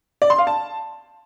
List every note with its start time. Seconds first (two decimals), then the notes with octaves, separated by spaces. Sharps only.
0.22 D5
0.30 C6
0.38 F5
0.47 A5